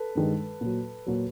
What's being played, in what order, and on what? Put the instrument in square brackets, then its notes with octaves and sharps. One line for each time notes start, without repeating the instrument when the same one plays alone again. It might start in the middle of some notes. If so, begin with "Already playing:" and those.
Already playing: [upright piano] A4 B4
G2 D#3 G#3
A#2 F#3
A#2 F#3